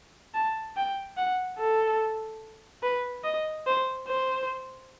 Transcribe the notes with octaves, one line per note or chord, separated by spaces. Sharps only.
A5
G5
F#5
A4
B4
D#5
C5
C5